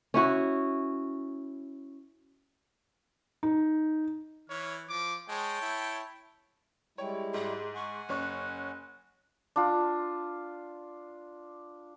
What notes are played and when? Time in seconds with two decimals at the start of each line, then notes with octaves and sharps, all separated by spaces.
0.14 C#4 E4 F#4
3.43 D#4
4.50 E3 C#5 F6
4.89 F3 D6
5.29 G#3 C#5 G5 A5
5.62 E4
6.98 G3 G#3 E4 C#5 G5
7.34 G#2 G#4
7.75 F#5 G#5 C#6
8.09 F#1 C#4 C#6 F#6
9.56 D4 F4